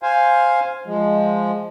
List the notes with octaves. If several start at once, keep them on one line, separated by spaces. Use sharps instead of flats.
C5 F5 G#5
F3 G#3